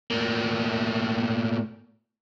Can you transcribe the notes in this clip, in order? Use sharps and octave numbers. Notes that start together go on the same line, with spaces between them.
A2 A#3